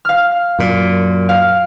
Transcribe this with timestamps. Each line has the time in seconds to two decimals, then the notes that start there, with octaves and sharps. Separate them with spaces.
0.05 F5 F6
0.59 F#2 A#2
1.29 F5